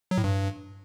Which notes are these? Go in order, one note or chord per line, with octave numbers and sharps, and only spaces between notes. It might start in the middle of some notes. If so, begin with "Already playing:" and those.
F#3
A2
G2